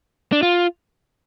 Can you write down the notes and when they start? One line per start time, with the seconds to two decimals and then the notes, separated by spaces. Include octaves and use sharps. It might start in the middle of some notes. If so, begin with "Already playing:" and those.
0.32 D4
0.43 F4